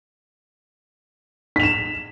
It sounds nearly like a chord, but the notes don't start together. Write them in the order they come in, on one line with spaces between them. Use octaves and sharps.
B6 F7 E7